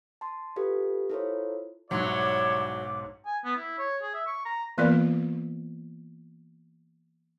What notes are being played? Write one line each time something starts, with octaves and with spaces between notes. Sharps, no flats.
A5 C6
F4 G4 A4 B4
E4 F4 A4 A#4 C5 C#5
B1 G#2 F#3 G3 E4 C#5 D6
G#5
B3
E4
C#5
G#4
E5
C#6
A#5
E3 A#3 B3 F4 A#4 D5